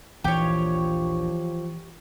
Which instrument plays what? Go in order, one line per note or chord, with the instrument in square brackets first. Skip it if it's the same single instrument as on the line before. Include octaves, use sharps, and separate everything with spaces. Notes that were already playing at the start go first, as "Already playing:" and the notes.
[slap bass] A#1 D#2 A#2 [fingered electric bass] E3 [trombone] F3 [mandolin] G4 C#5